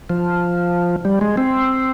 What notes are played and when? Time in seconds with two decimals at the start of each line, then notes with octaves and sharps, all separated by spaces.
0.10 F3
1.05 G3
1.21 G#3
1.37 C4